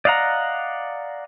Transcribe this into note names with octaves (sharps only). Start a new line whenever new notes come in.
D5 D#5 F5 F#5 A#5